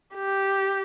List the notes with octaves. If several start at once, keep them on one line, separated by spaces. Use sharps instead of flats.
G4